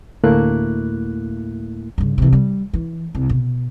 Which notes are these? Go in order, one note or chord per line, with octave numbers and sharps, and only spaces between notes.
D2 A2 A3 A#3 E4 F#6
G2 C#3
C3 E3
G3
E3
C2
B2